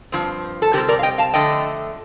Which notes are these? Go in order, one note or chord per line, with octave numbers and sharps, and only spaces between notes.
G2 F3 C4
A4
C3 G3 C4 G4 A#4
A#4 D5
F5
D#5 G5
F5 A5
D3 F3 A3 D#5 G5